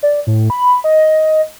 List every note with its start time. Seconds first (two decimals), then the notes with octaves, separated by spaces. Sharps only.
0.03 D5
0.27 A2
0.50 B5
0.84 D#5